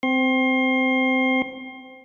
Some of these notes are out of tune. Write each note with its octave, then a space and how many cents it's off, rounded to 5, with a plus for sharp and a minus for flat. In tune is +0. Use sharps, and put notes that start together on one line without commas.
C4 -15 C6 +30